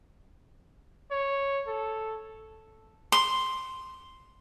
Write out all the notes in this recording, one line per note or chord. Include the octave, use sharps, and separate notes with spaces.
C#5
A4
C6